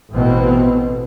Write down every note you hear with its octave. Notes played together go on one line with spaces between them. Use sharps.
A1 B2 C4